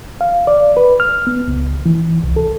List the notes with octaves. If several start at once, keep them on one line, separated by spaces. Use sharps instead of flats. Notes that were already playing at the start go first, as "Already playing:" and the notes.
F5
D5
B4
F6
B3
C#2
E3
C2
A4